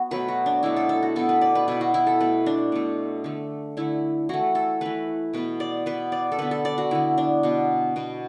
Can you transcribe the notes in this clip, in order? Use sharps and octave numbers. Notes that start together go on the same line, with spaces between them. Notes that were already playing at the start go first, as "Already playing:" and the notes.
Already playing: B3 F#4
B2 F#3 A3 B4
F#4
D4
B2 F#3 A3 E4
A4
A4
F#4
B2 B3 A4
B4
D5
B4
B2 B3 E4
F#4
E4
A4
B2 A3 B4
D4
B2 A3
D3 A3
D3 A3 E4
E3 A3 F#4
A4
E3 A3 B4
B2 B3 B4
D5
B2 B3 B4
D5
A4
D3 B3 B4
A4
D5
F#4
D3 B3 E4
D4
B2 B3
B2 B3